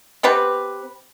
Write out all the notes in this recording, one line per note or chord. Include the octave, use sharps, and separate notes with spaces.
B3 C4 G4 B4